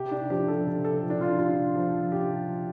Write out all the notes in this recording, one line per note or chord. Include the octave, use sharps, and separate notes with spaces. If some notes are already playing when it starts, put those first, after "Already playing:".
Already playing: C3 G4
D4
F3 G4
A4
C3
A4
F3
D4
F4
C3 F4
F3
C3 G4
F3